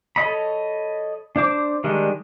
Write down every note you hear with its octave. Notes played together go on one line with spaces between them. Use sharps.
A4 C#5 D#5 B5
D4 C5 D6
D#3 G3 G#3 D4